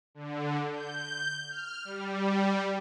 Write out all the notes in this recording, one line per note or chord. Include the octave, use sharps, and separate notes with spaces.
D3
G6
F6
G3